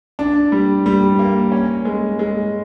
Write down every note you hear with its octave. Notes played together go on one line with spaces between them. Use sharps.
D4
G3
G3
A#3
C#4
G#3
G#3